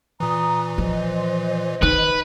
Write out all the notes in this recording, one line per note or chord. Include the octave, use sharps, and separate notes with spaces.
A#2 E3 A#5 D#6
F3 C5 D#5
D#3 B4